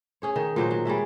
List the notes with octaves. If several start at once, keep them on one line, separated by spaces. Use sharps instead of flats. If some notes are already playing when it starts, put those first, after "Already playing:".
C#4 G#4 C#5
D#3
A#2 F#3 C5 D#5
F#3
G3 G#3 C#4 E5